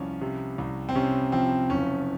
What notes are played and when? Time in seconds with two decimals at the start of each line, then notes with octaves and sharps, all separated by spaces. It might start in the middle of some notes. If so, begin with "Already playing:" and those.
Already playing: C2 F3 C#4
0.21 C3
0.58 C2
0.89 C4
0.95 C3 C#4
1.32 F3 C4
1.70 F#1 C#4